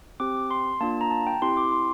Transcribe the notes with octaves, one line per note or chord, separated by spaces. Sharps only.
C4 G4 D6
C6
A#3 D4 F4 A5
A#5
A5
G5
C4 E4 G4 C6
D6
C6